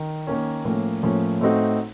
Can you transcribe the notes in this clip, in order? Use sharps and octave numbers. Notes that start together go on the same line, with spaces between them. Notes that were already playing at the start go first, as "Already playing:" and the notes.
Already playing: D#3
D#3 A#3 C#4
A2 F3 A#3 C#4
A2 F3 A#3 C#4
A2 A3 C4 D#4 F#4